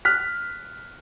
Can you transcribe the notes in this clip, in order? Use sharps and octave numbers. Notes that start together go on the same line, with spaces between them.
F6 F#6 B6